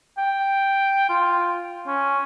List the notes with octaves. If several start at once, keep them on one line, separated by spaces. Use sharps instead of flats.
G5
F4
C#4